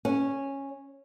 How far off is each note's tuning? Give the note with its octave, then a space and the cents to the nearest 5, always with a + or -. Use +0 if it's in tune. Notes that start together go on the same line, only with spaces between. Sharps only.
C#4 -10